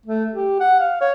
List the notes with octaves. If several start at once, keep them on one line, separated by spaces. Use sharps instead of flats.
A3
G4
F#5
F5
C#5